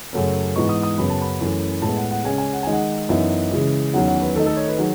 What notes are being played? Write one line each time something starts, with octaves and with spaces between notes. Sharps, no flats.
F#2 C#3 F#3 A3 C#4
G#2 E3 G#3 B3 D#4 C#6
D#6
D#6
F#2 C#3 F#3 B3 B5
A5
B5
F#2 E3 A3 C#4
A2 G#3 B3 A5
F#5
F#5
C#3 G#3 C#4 G#5
G#5
F#5
D#3 G#3 D#4 G#5
F#5
F#2 E3 B3 D#4 E5
C#3 E3 G#3
E2 D#3 F#3 C#4 F#5
F#5
B4
D#3 A3 D#4 A4
A4
C#5
B4
D#3 F#3 G#4